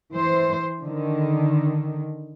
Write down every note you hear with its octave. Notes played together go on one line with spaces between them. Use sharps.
E3 C5
D3 D#3